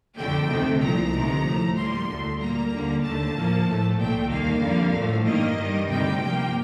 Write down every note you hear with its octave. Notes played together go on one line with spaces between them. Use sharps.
F2 D3 A3 G5
D2 C3 D#3 A3
C2 A#2 F3 A#5
D2 C3 D#3
A2 F3 A3
A2 G3 A#3 C6
D2 D3 A3
A#2 G3 A#3 A#5
D#2 D3 G3 A#3
D#2 D3 A3 A5
A2 F3 A#3
A2 A3
C2 A#2 A3 G5
D#2 D#3 G3 A#3 F5
F2 D3 G3 A#3
A2 F3 A3
G2 D#3 G3 A#3 D#5
G2 D#3 G3
D2 C3 D#3 G3 G5
G2 F3 A#3